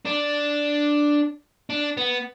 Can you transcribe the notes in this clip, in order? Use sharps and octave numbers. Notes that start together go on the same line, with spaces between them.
D4
D4
B3